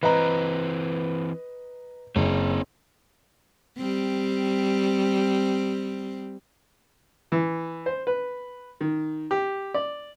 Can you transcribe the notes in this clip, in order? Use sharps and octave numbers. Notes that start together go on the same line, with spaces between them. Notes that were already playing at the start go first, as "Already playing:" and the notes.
E3 C4 B4 D#5 A#5
F#1 C4 C#5
G3 C4
E3
C5
B4
D#3
G4
D5